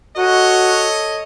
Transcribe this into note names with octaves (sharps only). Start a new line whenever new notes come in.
F#4 A4 C#5 D#5